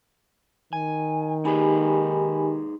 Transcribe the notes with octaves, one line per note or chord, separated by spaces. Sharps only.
D#3 G#5
D#4 G4 G#4 B4 G#5 B5